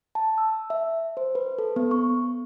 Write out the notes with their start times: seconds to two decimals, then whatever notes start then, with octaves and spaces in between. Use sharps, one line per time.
0.15 A5
0.38 E6
0.70 E5
1.17 C5
1.35 B4
1.58 A4
1.76 B3
1.91 C#6